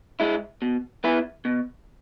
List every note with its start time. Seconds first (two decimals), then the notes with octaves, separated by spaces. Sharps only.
0.20 G#3 E4
0.62 B2
1.04 B3 E4 B4
1.45 B2